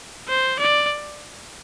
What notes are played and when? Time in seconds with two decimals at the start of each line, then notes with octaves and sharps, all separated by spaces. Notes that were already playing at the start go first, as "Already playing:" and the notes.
0.28 C5
0.59 D5